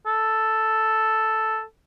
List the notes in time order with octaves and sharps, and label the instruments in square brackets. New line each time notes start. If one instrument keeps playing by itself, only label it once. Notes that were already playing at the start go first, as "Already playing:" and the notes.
[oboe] A4